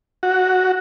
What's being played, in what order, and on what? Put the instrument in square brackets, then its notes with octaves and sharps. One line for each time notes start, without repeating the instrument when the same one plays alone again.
[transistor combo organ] F#4